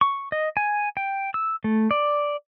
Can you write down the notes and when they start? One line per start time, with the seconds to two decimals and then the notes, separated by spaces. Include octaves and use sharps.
0.01 C#6
0.32 D#5
0.57 G#5
0.97 G5
1.34 E6
1.64 A3
1.91 D5